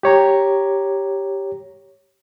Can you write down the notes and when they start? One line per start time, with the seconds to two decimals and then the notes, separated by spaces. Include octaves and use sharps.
0.03 G4 C#5 A#5